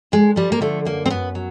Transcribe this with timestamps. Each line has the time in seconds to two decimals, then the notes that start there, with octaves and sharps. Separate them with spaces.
0.12 D2 G#3
0.36 F3 G3
0.52 A#3
0.61 D3 A3
0.85 F#2 A#3
1.06 C4
1.10 F#2 B3
1.35 F#3